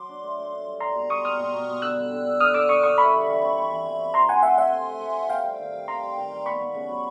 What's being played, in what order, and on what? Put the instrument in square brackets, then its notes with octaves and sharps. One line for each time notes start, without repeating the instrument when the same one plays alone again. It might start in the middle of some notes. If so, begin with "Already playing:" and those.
Already playing: [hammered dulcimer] F#3 [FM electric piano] C6 D6
[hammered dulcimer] D4
A3
A3
D4
G3
[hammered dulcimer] G3 [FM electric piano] A#5 C6
[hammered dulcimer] B2
[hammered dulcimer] G3 [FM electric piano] C#6 D#6
[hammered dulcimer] B2 [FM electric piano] D#6 F6
[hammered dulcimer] B2
B2
B2
[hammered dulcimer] D3 [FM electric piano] E6 F#6
[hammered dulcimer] G3
D3
D3
[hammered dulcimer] D3 [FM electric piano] D#6 F6
[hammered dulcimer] D3 [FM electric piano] D6 E6
[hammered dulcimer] D3 [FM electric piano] C#6 D#6
[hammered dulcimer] D3 [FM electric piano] C#6 D#6
[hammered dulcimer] E4 [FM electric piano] B5 C#6
[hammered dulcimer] G3
E3
C4
C4
E3
E3
C4
[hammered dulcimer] F3 [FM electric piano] A#5 C6
[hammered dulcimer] C3 [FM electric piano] F#5 G#5
[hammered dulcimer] A3 [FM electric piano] E5 F#5
[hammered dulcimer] A3 [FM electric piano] E5 F#5
[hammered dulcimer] C3
A3
A3
A3
[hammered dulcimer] C3 [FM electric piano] F5 G5
[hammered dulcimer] G3
D#3
G3
[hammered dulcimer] D#3 [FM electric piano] A#5 C6
[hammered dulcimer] G3
D#3
G3
[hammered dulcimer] B3 [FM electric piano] B5 C#6
[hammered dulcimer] B3
C#3
F#3